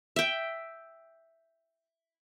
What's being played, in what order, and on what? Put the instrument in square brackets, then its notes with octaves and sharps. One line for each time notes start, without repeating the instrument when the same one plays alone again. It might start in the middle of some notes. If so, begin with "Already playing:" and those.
[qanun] E5 G5